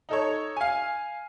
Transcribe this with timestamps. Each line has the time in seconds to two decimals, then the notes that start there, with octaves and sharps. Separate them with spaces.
0.09 D#4 A4 C#5
0.57 F5 G#5